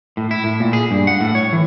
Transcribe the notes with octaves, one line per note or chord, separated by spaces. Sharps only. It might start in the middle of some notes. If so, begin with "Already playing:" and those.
A2
E4
A2
A#2
G#4
G2
F#5
A2
C#5
E3